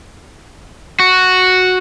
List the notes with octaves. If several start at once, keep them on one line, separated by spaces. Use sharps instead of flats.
F#4